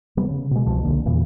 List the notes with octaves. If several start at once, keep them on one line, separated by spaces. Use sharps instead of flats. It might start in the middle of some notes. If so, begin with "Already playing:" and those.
C3 F#3 G3 B3
C#3
B2 G#3
C2 B2 F3
C2 D3 A#3
E2 A#2 C#3 E3